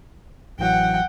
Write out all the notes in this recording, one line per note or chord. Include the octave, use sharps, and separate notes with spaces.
A1 E3 F#3 F#5 G5